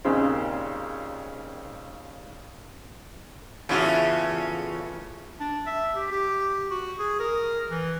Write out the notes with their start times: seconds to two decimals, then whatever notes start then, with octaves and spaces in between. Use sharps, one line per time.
0.05 D#2 A#2 C#3 C4
3.69 E2 A2 C#3 F4 F#4
5.40 D4
5.66 E5
5.96 G4
6.12 G4
6.71 F#4
6.99 G#4
7.20 A#4
7.71 E3